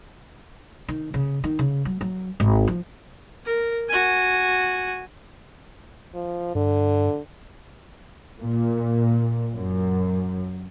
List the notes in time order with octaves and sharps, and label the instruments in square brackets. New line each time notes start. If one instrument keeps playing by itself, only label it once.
[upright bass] D#3
C#3
D#3
C#3
F#3
F#3
G#1
F3
[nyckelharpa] A#4
F#4 G#5
[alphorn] F3
[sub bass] G2 [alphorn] D3
[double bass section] A#2
F#2